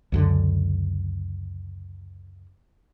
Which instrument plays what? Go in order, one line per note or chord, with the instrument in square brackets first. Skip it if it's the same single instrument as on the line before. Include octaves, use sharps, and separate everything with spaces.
[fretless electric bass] C#2 F#2 D3